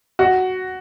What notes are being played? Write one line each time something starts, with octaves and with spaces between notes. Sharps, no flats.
F#4